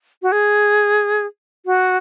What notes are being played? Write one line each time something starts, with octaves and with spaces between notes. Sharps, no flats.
F#4
G#4
F#4